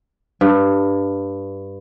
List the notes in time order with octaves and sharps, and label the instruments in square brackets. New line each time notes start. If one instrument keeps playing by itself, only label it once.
[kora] G2